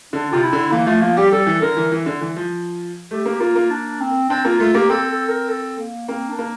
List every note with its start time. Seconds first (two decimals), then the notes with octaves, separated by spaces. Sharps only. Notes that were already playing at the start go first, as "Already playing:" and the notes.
0.13 D3 D4
0.32 C3 F4
0.43 E4
0.53 D3
0.72 E3 A#3
0.87 F3 A3
1.02 F3 A#3
1.17 G3 G4
1.32 G3 A4
1.47 E3
1.62 D3 A#4
1.77 E3
1.92 E3
2.06 D3
2.21 E3
2.36 F3
3.11 A3 G4
3.26 A#3
3.34 G4
3.40 A#3 F4
3.56 A#3
3.70 D4
4.01 C4
4.29 C4 D4
4.45 A#3 F4
4.60 A3 F4
4.74 A#3 G4
4.90 C4 A4
5.09 A4
5.29 A#4
5.49 A4
5.79 A#3
6.08 A#3 C4
6.29 D4
6.39 A#3